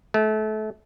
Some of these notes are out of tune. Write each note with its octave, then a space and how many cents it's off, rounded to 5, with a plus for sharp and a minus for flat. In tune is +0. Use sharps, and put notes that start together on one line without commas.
A3 -30